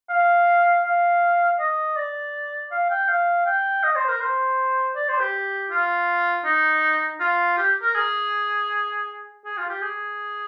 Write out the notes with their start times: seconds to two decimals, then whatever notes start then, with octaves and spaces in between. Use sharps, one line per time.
0.10 F5
0.84 F5
1.60 D#5
1.96 D5
2.72 F5
2.90 G5
3.09 F5
3.46 G5
3.83 D#5
3.96 C5
4.09 A#4
4.21 C5
4.96 D5
5.08 C5
5.21 G4
5.71 F4
6.45 D#4
7.20 F4
7.58 G4
7.82 A#4
7.95 G#4
9.45 G#4
9.58 F4
9.70 G4
9.82 G#4